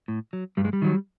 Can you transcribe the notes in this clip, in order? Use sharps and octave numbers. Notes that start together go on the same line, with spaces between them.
A2
F#3
G2 G3
G#3
G3
D#3 F#3